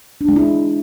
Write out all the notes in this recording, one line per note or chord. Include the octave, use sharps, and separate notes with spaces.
D4
G#3
E4